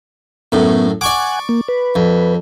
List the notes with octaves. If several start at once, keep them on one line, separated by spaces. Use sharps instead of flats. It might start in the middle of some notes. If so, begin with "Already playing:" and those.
F#2 A2 B3
D5 F#5 G#5 C#6 D6
A#3
B4
F2